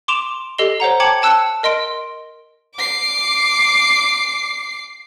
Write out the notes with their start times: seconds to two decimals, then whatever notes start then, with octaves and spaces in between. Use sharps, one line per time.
0.08 C6 D6 D7 E7 F7
0.58 G4 A4 D#5 C7 G7
0.80 C5 C#5 F#5 A#5
1.00 G5 A5 D6 G#6 C#7 F#7
1.22 G5 A5 E6 F#6 C#7 E7
1.63 A#4 D#5 C6 D7
2.76 D6 C7